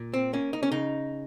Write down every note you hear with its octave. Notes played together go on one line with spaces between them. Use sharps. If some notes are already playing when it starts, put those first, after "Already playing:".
Already playing: A#2
C4
A#3 C#4
D#4
C#4
C#3 D#4